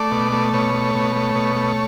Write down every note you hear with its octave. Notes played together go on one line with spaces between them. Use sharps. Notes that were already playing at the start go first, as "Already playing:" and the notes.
Already playing: A3 D5
B2
A3
B2 C#5
A3
B2
A3
B2
A3